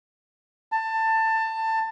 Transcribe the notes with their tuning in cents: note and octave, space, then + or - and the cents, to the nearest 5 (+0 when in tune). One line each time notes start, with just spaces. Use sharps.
A5 +20